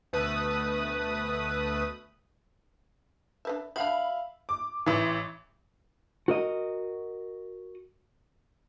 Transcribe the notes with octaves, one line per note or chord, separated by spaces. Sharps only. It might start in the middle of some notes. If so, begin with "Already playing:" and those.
D2 B2 A3 B4 D#6
D4 B4 E5
F#3 D4 E5 F5 B5
D6
A1 E3
F#4 A#4 D#5